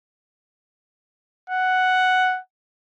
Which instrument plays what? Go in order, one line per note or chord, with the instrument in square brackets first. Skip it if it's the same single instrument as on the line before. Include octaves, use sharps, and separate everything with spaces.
[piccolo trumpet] F#5